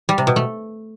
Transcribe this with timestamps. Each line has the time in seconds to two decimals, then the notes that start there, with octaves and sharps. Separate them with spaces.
0.09 G3
0.18 C3
0.27 B2
0.36 A3